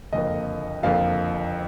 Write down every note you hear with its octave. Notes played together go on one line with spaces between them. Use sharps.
F#1 F2 D3 F3 A#3 D#5
F#1 F2 D3 F3 A#3 F5